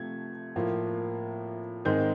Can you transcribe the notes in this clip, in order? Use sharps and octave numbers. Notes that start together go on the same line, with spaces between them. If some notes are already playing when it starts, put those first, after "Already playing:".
Already playing: C3 F3 A3 G#6
A2 F3 A#3
G#2 D#3 G#3 C4 G6